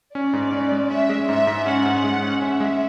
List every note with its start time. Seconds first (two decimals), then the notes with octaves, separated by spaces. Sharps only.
0.14 C#4 D5
0.33 G#2
0.52 C#4
0.72 G#3
0.90 C#4 E5
1.09 G#3
1.28 G#2 E5
1.47 G#2
1.66 C#4 F#5
1.86 G#2
2.04 G#3
2.23 C#4
2.41 C#4 E5
2.60 G#3